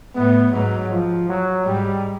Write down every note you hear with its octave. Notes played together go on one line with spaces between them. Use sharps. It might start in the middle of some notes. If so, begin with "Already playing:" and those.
A2 B3
G#2 F#3
F3
F#3
G#2 G3